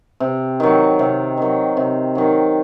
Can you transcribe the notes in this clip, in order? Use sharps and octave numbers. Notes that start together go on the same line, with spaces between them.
C3
D#3 F#3
C3
D#3 F#3
C3
D#3 F#3